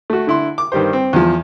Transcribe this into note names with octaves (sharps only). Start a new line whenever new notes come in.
A3 F#4
D3 E4 C6
D6
G2 D#3 G3 G4 C5
C4
E2 F3